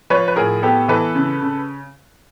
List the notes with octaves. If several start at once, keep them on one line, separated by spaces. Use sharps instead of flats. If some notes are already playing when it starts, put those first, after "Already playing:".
F3 B4 C#5
B4
A2 G#4 A#4
B3 G4 A4
E3 A4 B4
C#3
C#3